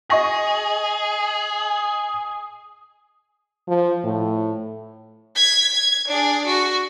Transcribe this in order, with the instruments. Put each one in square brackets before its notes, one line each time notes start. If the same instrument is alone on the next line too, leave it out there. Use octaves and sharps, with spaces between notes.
[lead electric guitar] G#4 [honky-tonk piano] D#5 C#6 A#6
[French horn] F3
A2
[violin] G#6 B6
G#6
D4 G#4
F#4